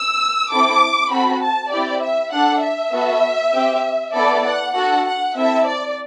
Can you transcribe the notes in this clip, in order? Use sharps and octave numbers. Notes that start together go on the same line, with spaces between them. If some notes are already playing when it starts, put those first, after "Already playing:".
Already playing: E6
C4 E4 A4 D6
C4 F#4 A4 B5
A5
C4 E4 G4 D5
E5
D4 A4 F#5
E5
B3 F#4 A4
C4 G4
B3 E4 A4 D5
F#5
D4 F#4 A4 F#5
F#5
C4 E4 A4 E5
D5